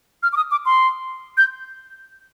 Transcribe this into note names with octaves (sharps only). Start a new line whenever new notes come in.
F6
D6
D#6
D6
C6
G6